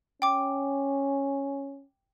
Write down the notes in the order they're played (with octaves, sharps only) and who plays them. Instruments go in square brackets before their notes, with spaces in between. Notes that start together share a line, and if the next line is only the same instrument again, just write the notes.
[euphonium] C#4 [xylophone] G5 D6